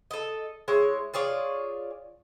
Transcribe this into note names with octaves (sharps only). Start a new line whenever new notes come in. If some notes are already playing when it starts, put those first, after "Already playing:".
A4 D#5
G#3 E4 C#5
F4 G#4 C#5 D5